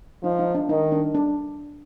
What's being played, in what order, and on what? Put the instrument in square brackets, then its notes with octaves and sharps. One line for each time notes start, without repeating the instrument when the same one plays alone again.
[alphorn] F3 [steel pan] D#4
[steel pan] D#4
D4
[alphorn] D#3 [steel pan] D#4
[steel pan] D4
D4